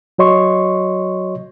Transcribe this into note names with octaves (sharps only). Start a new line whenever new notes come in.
F#3 F#4 C#5 D#5 C6 C#6